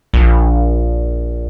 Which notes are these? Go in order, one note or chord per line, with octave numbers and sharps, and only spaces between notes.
A#1